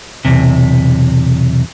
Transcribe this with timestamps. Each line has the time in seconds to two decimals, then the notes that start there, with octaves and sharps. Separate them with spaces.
0.25 B1 E2 C3